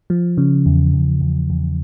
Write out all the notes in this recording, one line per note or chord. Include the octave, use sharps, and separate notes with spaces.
F3
C#3
E2
E2
E2
E2